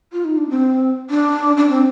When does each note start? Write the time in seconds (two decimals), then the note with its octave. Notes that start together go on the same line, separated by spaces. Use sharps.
0.13 F4
0.25 D#4
0.37 D4
0.50 C4
1.10 D4
1.57 D4
1.70 C4